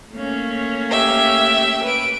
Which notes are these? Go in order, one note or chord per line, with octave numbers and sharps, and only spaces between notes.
A3 A#3 C#4
G4 E5
B4 D7